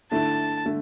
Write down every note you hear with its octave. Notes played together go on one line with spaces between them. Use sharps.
D3 A3 E4 A5
D3 A3